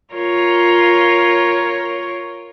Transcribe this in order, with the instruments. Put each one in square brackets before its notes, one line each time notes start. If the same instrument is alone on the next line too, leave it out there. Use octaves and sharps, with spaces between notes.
[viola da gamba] F4 A#4 C#5